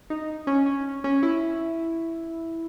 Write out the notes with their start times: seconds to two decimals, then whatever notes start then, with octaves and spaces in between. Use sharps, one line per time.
0.10 D#4
0.47 C#4
0.66 C#4
1.04 C#4
1.23 E4